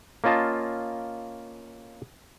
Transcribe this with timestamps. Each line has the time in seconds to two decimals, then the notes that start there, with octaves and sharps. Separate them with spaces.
0.24 A#3 C#4 F4 D#5 A5